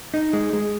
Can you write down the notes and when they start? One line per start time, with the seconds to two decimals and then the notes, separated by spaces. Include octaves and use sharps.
0.14 D#4
0.33 G#3
0.53 G#3